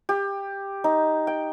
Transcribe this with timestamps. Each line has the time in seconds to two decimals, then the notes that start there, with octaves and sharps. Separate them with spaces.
0.09 G4
0.84 D#4
1.27 G5